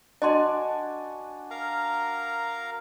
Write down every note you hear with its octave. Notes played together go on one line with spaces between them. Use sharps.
D4 F#4 D#5 G#5 C6
A#4 F5 A#5